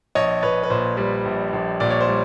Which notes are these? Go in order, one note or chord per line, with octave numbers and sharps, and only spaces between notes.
A#1 C#5 D#5
A#1 B4 C#5
B4
A#2 C5
G3 B4
A#1
A#1
A#2 D5
C#5
C5
G3